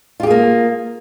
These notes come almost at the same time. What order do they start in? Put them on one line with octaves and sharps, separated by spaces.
F4 G4 G#4 A#3